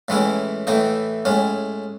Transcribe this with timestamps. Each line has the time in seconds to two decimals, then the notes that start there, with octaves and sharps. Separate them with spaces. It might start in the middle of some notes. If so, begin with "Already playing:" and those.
0.08 A2 E3 G#3 C#4 E4
0.67 A2 E3 A3 D#4
1.25 A2 G#3 C#4